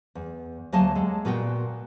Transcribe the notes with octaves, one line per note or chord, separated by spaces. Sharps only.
E2
D2 F#3 A#3 D#5 G#5 A5
G#3 A4
A#2 B3 F#4 A#4 F#5 G5